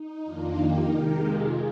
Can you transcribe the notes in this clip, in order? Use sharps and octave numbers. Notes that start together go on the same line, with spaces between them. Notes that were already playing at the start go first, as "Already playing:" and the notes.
Already playing: D#4
F2 D#3 A#3 D4 F4
D#4 G4
C3 D#3 G#3 G4 A#4
F4 G#4